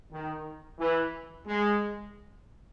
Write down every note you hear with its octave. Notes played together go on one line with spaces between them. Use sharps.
D#3
E3
G#3